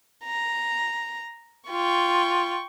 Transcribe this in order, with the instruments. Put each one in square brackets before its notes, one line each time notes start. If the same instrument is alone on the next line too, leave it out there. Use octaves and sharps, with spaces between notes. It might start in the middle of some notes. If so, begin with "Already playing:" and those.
[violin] A#5
[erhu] F4 [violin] G5 C#6